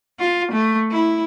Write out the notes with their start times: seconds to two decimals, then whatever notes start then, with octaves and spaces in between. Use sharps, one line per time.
0.19 F4
0.51 A3
0.91 E4